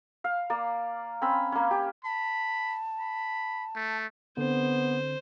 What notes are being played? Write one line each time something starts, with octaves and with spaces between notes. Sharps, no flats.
F5
A#3 D5
C4 C#4 B5
A#3 C#4
G4
A5 B5
B5
A3
D3 B3 C4 C5